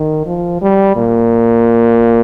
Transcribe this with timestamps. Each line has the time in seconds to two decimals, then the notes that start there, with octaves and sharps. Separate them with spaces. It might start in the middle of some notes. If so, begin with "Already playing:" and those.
Already playing: D#3
0.26 F3
0.62 G3
0.97 A#2